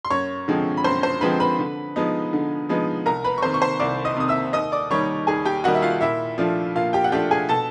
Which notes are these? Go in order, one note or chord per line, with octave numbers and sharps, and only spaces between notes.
C6
F#2 C#5 C#6
D3 F3 G#3 C4
B5
F#2 C5 C6
C5 C6
D3 F3 G#3 C4 B4 B5
B4 B5
D3
F3 G#3 B3 D#4
D3
F3 G#3 B3 D#4
C2 A#4 A#5
B4 B5
C#6
C3 D#3 C5 C6
C#6
C5 C6
C2 D5 D6
D#5 D#6
C3 D#3 D#6
E5 E6
D#2 D#5 D#6
D5 D6
D#3 G3 A#3 D#4 C#5 C#6
D#2 G#4 G#5
G4 G5
D#3 G3 A#3 D#4 F#4 F#5
E5
F4 F5
A#2 E4 E5
F3 A3 D4 F4
A#2 F4 F5
G4 G5
F#5
F3 A3 D4 F4 G4 G5
G#4 G#5
B2 A4 A5